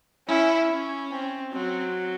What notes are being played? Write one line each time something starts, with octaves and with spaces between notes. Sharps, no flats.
C#4 E4
C#4
C4
F#3 C4